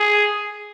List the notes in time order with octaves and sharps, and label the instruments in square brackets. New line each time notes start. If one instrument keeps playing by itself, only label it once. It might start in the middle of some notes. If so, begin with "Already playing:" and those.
Already playing: [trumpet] G#4